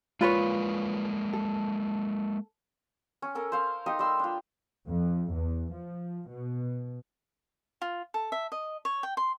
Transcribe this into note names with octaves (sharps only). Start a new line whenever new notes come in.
G#3 A#3 F4 B4 C#5 D5
A4
C#4
C#4 A4 A#4
C5 F5
D#4 G4 D#5 F5
G3 C6 E6
D4 F4
F2
E2
F3
B2
F4
A4
E5
D#5
C#5
G5
C6